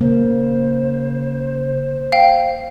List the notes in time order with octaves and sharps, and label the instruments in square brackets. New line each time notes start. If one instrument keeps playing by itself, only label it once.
[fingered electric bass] C#3 [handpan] A#3 [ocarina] C5
[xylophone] F5 G5